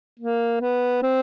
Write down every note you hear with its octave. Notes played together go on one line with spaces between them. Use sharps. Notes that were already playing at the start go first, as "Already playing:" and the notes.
A#3
B3
C4